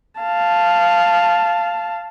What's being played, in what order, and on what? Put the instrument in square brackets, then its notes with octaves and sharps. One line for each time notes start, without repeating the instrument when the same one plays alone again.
[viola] F5 A5